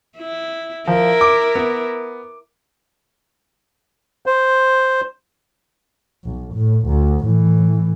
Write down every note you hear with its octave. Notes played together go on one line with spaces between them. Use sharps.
E4
F3 E4 A#4
D6
B3
C5
B1
A2
D2
A2 E3